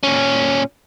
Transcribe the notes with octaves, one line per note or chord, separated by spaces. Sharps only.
A#2 C#4